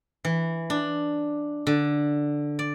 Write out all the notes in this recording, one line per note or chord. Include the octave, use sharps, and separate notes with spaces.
E3
D4
D3
D5